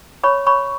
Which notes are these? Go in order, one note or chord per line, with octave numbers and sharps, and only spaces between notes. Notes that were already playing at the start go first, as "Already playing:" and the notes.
C#5 B5 C#6
C#5 B5 C#6